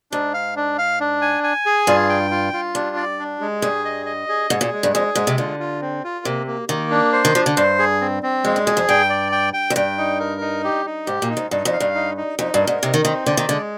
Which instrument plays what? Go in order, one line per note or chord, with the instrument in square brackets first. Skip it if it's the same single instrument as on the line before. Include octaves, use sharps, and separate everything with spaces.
[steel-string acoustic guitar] G#2 [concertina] D4
[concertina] F5
D4
F5
D4
G#5
G#5
G#4
[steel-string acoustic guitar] G2 [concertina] F4
[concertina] G5
F4
F4
[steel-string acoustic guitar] G2 [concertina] D4
[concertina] D5
D4
G#3
[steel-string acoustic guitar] G2 [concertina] G#4
[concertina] D#5
D#5
G#4
[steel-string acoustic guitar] G#2 [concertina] G#4
[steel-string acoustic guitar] A#2
[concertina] G#3
[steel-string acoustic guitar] G2
[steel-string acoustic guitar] F2 [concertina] G#4
[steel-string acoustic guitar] G#2 [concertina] G#3
[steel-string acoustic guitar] C3
[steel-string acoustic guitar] D3 [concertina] F4
[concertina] F4
C4
F4
[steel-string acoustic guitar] C3 [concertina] A#3
[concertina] A#3
[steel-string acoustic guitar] D#3 [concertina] A#3
[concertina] D4
C5
[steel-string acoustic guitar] D#3
[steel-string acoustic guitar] F3 [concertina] D4
[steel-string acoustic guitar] D3
[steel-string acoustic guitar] G2 [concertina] C5
[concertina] G#4
C4
C4
[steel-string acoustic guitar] F2 [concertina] G#3
[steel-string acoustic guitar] G2
[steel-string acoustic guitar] F2 [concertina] G#4
[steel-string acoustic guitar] F2
[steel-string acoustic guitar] G2 [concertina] G5
[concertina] D5
G5
G5
[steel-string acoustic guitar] F2
[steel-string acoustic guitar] G2 [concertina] G5
[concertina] D#4
A#4
D#4
G4
D#4
[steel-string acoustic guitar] G#2 [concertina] G4
[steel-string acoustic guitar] A#2
[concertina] D#4
[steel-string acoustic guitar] G#2
[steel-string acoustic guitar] G2 [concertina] D#4
[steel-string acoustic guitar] F2
[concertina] F5
[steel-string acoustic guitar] G2
[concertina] D#4
D#4
[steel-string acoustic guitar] F2 [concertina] D#4
[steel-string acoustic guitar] G2
[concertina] A#4
[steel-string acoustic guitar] G#2
[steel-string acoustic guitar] C3 [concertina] D#4
[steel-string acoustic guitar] D#3
[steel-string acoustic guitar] D#3 [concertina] C4
[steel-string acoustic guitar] D3 [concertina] D5
[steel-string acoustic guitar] D#3
[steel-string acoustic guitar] D3 [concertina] G#3